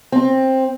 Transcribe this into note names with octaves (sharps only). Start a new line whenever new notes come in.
C4